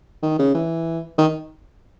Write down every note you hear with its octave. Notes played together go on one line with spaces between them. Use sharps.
D#3
C#3
E3
D#3